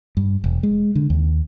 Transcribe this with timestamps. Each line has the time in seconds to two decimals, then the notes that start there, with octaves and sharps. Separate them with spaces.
0.17 G2
0.44 E1
0.63 G#3
0.95 D3
1.10 D#2